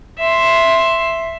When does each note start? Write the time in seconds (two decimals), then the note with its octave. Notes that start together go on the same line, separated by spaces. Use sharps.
0.19 E5 C6